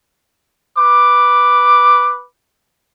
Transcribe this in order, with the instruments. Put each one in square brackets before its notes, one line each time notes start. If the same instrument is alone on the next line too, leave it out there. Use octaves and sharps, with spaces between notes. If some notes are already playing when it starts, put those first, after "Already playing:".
[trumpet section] B4 D6